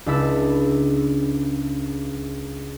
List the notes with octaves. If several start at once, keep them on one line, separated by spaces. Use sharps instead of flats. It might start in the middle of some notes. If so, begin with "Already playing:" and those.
C#2 D4 E4 A5 B5 E6